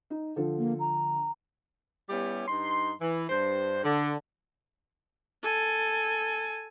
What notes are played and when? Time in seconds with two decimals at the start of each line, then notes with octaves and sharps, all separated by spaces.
0.10 D#4
0.36 D3 F3 A4
0.59 A#3
0.80 A#5
2.10 G3 B3 C#4 E4 G4
2.48 G2 D#4 C6
3.01 E3
3.30 G2 C5
3.84 D3
5.43 A4 G#5